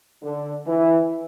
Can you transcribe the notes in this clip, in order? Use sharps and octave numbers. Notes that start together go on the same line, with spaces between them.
D3
E3